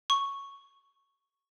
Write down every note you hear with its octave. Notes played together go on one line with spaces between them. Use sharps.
C#6